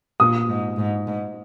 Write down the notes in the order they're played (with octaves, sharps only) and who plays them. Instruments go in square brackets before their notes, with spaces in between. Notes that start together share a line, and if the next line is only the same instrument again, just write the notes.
[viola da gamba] A#2 [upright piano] D#6
[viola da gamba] G#2
G#2
G#2